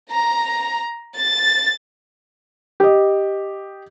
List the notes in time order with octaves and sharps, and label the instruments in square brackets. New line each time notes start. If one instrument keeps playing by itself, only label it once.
[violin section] A#5
A6
[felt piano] G4 D#5